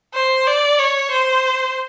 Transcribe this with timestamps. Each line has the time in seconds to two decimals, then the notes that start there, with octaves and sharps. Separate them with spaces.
0.15 C5
0.47 D5
0.79 C#5
1.11 C5